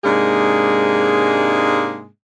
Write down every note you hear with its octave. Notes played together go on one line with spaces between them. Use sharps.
G#2 C3 G#3 A#3 D4 G#4